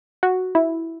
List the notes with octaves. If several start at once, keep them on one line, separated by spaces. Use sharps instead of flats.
F#4
E4